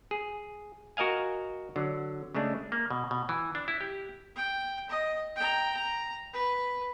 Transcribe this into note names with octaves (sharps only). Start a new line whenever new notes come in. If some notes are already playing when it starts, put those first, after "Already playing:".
G#4
F#4 A#4 D#5 F5 G#5
D3 F#3
C#3 G#3 A3 D4
A#3
B2
B2
E3
D4
E4
G4
G5
D#5
G5 A#5
A#5
B4